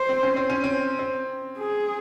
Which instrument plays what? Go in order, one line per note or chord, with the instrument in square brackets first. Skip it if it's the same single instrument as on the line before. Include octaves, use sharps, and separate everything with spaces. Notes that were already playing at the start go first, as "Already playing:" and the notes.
Already playing: [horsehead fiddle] C5
[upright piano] C4
C#4
C4
C#4
C4
C4
[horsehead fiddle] G#4